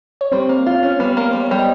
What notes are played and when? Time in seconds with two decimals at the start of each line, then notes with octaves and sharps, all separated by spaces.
0.21 C#5
0.32 G3 C4 C5
0.49 A#3
0.66 F4
0.83 C#4
0.99 G3 B3 B4
1.17 A#3
1.31 G3 C5
1.40 C#5
1.49 G3 D5
1.59 D#5